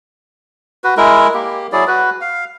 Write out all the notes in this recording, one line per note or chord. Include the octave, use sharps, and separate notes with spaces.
F#4 B4
G#3 E4 A#4
A#3 G4
F#3 E4 G#4 D5
F#4 B4
F5